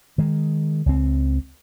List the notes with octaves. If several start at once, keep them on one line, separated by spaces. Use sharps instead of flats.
D#3 G#3
C#2 C4